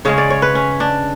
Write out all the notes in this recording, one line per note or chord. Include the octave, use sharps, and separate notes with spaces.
C#3 G#3 C#4 C#5
D5
C#5
B4
C#4
D4